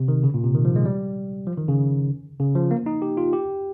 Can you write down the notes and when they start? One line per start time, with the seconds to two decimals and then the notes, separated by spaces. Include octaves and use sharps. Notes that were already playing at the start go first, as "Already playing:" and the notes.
Already playing: C3
0.08 D#3
0.23 C#3
0.34 A#2
0.44 C3
0.55 D#3
0.65 F3
0.76 G#3
0.85 G3
1.47 F3
1.57 D#3
1.68 C#3
2.40 C#3
2.55 F3
2.71 A#3
2.86 D#4
3.02 G4
3.17 F4
3.33 G4